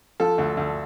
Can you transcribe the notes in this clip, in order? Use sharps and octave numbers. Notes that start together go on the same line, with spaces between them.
F3 A4
D2
D2